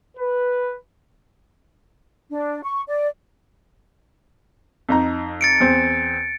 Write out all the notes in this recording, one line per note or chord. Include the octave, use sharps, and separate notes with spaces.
B4
D4
C#6
D5
F2 D#4 A#5
A6 C#7 D7
E2 C4